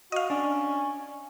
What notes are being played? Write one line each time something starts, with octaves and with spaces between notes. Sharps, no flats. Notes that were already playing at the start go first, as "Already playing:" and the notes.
F#4 D#5 F5
C#4 D4